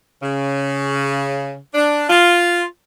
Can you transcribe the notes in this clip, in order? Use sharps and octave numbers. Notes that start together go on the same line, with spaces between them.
C#3
D4
F4